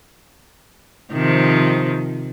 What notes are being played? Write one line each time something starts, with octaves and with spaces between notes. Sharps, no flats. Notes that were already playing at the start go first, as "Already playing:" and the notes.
C3 D#3 F3